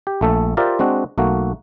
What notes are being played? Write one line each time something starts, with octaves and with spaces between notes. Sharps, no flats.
G4
A#1 A3 A4
F4 G4 A#4 C5 D5 E5
G#3 C4 D4 F#4
B1 A3 A#3 F#4